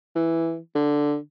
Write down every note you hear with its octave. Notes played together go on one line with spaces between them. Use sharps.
E3
D3